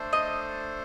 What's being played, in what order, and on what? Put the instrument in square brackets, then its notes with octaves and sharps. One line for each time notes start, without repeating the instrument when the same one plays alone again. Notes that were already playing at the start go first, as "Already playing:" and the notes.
Already playing: [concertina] A3 D4 A4 C5
[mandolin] D#5